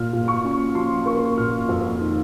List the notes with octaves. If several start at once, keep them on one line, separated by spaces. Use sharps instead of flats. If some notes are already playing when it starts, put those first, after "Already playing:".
Already playing: A#2 F6
A#2
C#6
C#4
F3 C6
A#3 C#6
A#2 F6
F2
D#3